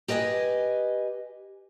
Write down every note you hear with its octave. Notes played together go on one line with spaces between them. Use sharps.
G4 B4 D#5 G5 G#5